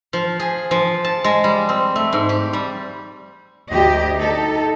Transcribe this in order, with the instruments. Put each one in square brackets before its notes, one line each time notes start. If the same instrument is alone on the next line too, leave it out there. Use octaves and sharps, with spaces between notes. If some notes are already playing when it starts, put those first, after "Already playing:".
[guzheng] F3
G#4
F3
A5
G#3
G3
C4
A3
G#2
G4
G3
[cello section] D2 G4 D#5
D#4 A4